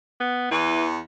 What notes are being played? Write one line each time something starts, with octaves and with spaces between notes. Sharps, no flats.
B3
E2 E3